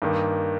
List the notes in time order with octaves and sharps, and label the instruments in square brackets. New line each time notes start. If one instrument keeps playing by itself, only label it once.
[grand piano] G2 D#3 A#3